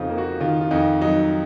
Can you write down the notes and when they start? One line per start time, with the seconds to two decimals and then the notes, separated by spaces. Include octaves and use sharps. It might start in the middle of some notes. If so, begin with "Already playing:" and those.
Already playing: F2 C#3 C4 D#4 F4
0.10 A#3
0.18 F#4
0.40 D#3 F4
0.61 F4
0.71 F2 D#4
1.01 F#3 D#4